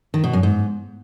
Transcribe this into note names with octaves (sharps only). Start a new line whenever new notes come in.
D#3
B2
F#2
G#2